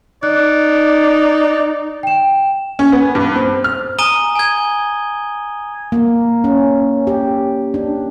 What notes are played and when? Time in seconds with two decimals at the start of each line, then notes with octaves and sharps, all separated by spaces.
0.23 D#4 D5 F#6
2.03 G5 E7
2.79 C#4
2.92 B3
3.15 G2
3.36 C4
3.64 F6
3.99 G#5 A#5 D#6 D#7 G7
4.36 G#5 G#6
5.92 A#3
6.44 C#4
7.07 G4
7.74 D4